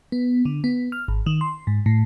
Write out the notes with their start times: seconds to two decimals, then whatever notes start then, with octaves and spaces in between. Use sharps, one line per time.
0.12 B3
0.45 D3
0.64 B3
0.92 F6
1.08 G#1
1.26 D#3
1.41 C6
1.67 G#2
1.86 A2